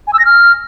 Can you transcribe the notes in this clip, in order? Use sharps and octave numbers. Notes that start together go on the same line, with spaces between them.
G#5
E6
A#6
F6